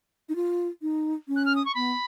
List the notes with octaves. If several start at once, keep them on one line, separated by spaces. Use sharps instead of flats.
D#4
F4
D#4
C#4
F#6
F6
D#6
C#6
B3 B5